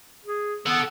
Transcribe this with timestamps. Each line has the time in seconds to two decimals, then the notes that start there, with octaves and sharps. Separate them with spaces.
0.25 G#4
0.66 B3 A4 F#5